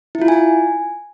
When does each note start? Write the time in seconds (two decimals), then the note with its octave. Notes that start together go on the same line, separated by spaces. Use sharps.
0.15 E4
0.22 F4
0.28 G#5